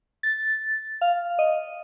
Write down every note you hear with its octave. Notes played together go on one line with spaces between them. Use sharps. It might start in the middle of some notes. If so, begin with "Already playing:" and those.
A6
F5
D#5